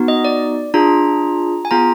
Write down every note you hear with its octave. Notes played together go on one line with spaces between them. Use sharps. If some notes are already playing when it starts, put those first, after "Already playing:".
Already playing: B3 D#4 F#4
D#5
D5
D4 F4 G#4 A#5
G#5
B3 F4 G#4 A#5